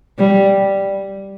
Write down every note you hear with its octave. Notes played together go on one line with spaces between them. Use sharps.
G3